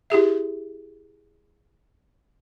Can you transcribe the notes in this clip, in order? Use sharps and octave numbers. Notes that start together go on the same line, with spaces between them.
E4 G4 G#4 E5